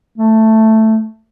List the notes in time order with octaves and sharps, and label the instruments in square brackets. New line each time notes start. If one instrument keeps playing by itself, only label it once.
[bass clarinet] A3